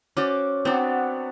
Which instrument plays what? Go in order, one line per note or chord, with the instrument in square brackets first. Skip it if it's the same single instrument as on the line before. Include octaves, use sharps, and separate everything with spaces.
[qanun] C#4 F#4 C5 [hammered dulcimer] D5 D6
[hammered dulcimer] F#3 B3 D4 [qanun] C4 F#4